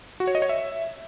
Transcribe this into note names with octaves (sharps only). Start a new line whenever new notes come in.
F#4
C#5
D#5
C#5
E5